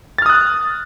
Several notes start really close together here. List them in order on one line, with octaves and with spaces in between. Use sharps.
A6 F6 D#6 F#6